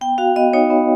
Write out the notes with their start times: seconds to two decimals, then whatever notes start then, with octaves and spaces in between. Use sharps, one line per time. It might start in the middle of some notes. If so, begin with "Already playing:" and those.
0.01 B3 G5
0.18 F#4 F5
0.36 B3 D#5
0.53 D#4 C#5
0.70 B3